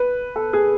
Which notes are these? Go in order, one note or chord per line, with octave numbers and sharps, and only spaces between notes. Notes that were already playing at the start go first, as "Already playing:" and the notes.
Already playing: B4
A4
G#4